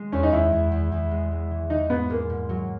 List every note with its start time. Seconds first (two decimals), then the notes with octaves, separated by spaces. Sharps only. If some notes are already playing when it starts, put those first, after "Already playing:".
Already playing: G#3
0.12 E2 C#4
0.23 D#4
0.32 E2 E4
0.52 E2
0.72 E2
0.92 E2
1.11 G#3
1.31 G#3
1.51 E3
1.70 E3 D#4
1.90 G#2 B3
2.10 G#3 A#3
2.30 G#2
2.49 F#3